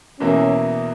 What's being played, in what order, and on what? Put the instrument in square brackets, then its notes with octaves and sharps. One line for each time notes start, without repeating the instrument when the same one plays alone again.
[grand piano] E2 B2 A#3 E4 [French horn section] C#4